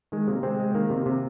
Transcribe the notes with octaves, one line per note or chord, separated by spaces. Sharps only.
D#3 G#3
C3 A#3
C3 G#3 C4
G#3
D#3 A#3
C3
C3